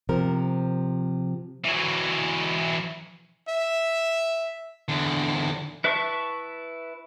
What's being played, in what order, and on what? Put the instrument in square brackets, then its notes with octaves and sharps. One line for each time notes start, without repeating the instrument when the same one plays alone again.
[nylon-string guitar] C3 F3 A#4
[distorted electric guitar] E3 F#3
[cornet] E5
[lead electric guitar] E2 D3
[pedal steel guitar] E4 B4 E5 A5 C#6